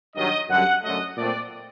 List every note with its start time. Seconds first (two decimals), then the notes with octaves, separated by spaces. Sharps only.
0.15 G2 D#3 F#3 D#5
0.49 F#2 D3 G3 F#5
0.83 F#2 D3 F#3 A3 D#5
1.17 A#2 A3 C4 D5